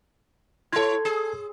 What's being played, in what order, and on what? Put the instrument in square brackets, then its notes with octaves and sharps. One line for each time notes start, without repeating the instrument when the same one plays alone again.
[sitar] E4 C#5 [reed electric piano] A4 G#6
[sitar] G#4